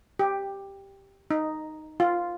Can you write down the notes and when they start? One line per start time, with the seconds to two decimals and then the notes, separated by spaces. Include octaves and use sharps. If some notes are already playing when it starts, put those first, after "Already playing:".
0.19 G4
1.31 D#4
2.00 F4